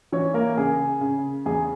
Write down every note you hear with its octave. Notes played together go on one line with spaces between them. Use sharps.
E3 C#4 C#5
A#3 A#4
C#3 G#4
C#3
E2 G#4